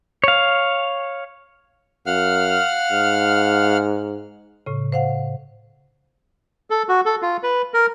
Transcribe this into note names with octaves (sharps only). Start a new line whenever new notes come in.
C#5 F5
F#2 F5 F#5 F6
G#2
A2 C#3
C5 F5 F#5
A4
F#4
A4
F4
B4
A#4